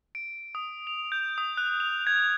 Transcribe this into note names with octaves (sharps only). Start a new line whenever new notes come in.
D7
D#6
F7
G6
D#6
F#6
F7
G#6